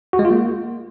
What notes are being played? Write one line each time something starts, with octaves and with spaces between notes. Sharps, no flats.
F#4
G#3
F4
A#3